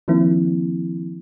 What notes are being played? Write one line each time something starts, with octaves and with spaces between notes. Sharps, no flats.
D#3 F3 A#3 C4 E4